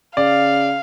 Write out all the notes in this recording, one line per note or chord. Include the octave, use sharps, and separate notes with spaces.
C#3 D5 F5